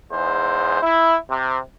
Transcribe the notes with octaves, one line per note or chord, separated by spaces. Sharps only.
E2 G#2 C5
E4
C3